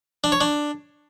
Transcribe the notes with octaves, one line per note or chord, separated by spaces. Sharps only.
D4
C#5
D4